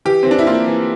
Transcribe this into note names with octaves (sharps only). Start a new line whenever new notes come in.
E3 G4
C4
E3
D4
E4
A#3 F4
E3